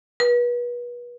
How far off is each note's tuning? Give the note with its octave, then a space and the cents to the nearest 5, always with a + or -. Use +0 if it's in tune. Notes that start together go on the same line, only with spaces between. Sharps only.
B4 -35